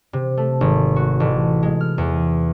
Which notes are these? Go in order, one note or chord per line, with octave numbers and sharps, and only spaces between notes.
C3
A3
G#1
F#4
A1
G#3
F6
E2